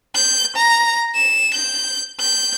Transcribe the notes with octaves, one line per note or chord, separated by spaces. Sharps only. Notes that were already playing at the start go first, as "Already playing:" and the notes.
G6
A#5
E7
G6
G6